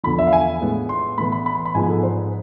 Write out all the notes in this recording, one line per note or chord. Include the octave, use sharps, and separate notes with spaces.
E2 D3 F3 B5
E5
F5
G#5
A2 G#3 B3
C6
A2 E3 B3 B5
B5
B5
C6
B5
G#2 F3 G#3 B3 G#5
A4
C5